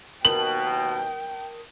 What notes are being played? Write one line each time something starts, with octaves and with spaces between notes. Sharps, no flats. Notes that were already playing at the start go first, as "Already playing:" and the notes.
D#2 B2 A#4 G5 A5 D#6 F#7